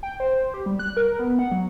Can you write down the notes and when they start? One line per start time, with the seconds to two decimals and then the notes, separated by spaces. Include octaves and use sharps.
0.03 G5
0.20 C5
0.54 G4
0.66 G3
0.79 F#6
0.97 A#4
1.19 B3
1.39 F#5
1.52 F#3